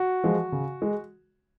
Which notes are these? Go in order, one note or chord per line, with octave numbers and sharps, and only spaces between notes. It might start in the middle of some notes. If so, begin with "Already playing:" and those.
Already playing: F#4
F3 G#3
C#3
G#3